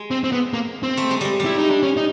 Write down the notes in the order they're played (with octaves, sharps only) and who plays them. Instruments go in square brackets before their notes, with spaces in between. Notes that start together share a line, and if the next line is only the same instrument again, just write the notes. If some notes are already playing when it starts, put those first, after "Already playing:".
Already playing: [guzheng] G#3
[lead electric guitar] C4
C4
B3
A#3
C4
[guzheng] A3
G#3
G3 G#3
G3
[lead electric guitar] E4
D#4
D4
C#4
D#4